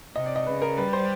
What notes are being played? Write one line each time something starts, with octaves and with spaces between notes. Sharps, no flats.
C3 D#5
D5
D#5
C#3 B4
A#4
G3 B4
C5